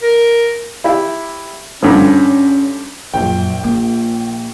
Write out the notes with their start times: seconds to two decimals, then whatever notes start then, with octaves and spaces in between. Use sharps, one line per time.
0.03 A#4
0.84 E4 G4 E5
1.83 G2 D3 F3 C#4
3.14 A#1 F#2 A#2 G5
3.64 A#3